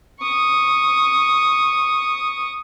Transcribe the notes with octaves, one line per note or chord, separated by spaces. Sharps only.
C#6 D#6